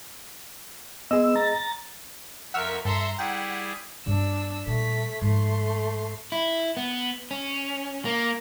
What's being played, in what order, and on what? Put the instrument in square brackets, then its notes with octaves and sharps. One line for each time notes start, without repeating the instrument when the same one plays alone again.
[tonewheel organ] B3 E6 [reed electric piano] G#4 D#5
[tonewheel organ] A#5 A6
[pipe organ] F2 C#6 [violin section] A#4 E5 B6 [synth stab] F#5 E6 F6
[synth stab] G2 [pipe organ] A4 [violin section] E5 A#5 C6
[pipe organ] G3 E4 G#4 [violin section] F#5 [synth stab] G5
[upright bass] G2 B3 [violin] D4 E6
[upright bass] A#2 G3 [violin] A3 B6
[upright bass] G#2 F3 [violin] A3 C6
[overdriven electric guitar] E4
B3
C#4
A#3